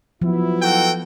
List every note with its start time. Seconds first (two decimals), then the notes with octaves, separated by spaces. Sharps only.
0.22 F3 F#3 B3 E4
0.62 F#4 A4 G5